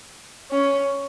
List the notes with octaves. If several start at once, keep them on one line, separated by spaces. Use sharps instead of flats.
C#4